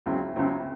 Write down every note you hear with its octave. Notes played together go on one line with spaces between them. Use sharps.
C#2 C#3 F#3 C4 E4
C#2 C#3 F#3 C4 E4